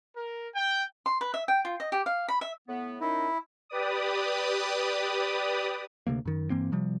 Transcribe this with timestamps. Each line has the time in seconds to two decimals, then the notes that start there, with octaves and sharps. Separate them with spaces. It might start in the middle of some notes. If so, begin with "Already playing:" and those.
0.16 A#4
0.55 G5
1.06 C6
1.21 B4
1.34 E5
1.48 G5
1.65 F4
1.80 D#5
1.92 G4
2.06 F5
2.28 B5
2.41 E5
2.67 A2 B3
3.01 D#3 C#4 D#4 E4
3.70 G4 B4 D5 D#6
6.07 D2 C3 F#3 A#3
6.25 F#2 D#3
6.50 G2 E3 A#3 C4
6.72 C3 F3 G3